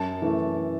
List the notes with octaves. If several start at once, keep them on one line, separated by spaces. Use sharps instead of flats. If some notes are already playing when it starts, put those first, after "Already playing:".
Already playing: F#2 A5
E3 A3